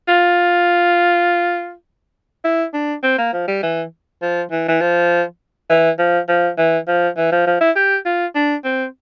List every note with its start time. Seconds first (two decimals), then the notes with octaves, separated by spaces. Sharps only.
0.08 F4
2.44 E4
2.74 D4
3.03 C4
3.18 A#3
3.33 F3
3.48 G3
3.63 E3
4.22 F3
4.51 E3
4.68 E3
4.81 F3
5.70 E3
5.99 F3
6.29 F3
6.58 E3
6.88 F3
7.17 E3
7.32 F3
7.47 F3
7.61 E4
7.76 G4
8.06 F4
8.35 D4
8.64 C4